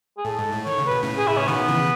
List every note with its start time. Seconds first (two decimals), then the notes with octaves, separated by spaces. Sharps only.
0.17 G#4
0.25 A2 A4
0.39 G#2
0.52 A2
0.66 D#3 C#5
0.78 C#3
0.86 B2 B4
1.03 A2 C#3
1.17 G#4
1.27 E4
1.37 C#4
1.48 B2 D#3 B3
1.68 C#3 E3